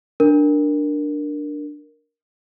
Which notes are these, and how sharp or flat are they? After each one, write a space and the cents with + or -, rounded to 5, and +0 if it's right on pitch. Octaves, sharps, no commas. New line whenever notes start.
D4 +5 A#4 +0